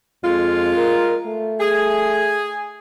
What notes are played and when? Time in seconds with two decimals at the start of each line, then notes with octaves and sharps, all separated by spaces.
0.23 F2 G#3 F4
0.76 A#4
1.27 A3
1.59 G#4